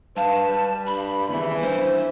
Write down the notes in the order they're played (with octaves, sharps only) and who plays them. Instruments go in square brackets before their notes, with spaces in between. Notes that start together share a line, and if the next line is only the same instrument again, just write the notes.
[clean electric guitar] G2 F5 [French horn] B4 [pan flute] A5
[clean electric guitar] G3
[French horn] G2 [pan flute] B5
[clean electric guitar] D#2 C#3 B3 [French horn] E3
[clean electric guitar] G2 C#4 [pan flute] C5